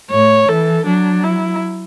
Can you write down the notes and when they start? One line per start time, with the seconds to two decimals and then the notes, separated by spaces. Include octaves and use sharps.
0.10 A2 C#5
0.48 E3 A4
0.86 F#3 D4
1.24 E4